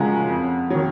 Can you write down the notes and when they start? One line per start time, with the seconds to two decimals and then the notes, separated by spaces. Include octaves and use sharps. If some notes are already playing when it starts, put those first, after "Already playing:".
Already playing: F#2 C#3 F3 G#3 F#5 A#5
0.30 F2
0.70 D#3 F#3